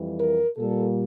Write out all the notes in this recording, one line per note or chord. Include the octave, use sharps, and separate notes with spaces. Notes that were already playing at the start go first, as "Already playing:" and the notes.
Already playing: F2 E3 G3
A#4
A#2 G3 A4